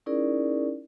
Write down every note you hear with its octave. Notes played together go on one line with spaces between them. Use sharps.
C#4 D#4 E4 G#4 A#4 D5